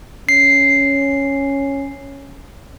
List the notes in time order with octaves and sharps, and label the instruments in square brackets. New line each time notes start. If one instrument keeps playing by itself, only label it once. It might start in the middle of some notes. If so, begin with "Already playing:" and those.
[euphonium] C#4 [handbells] C7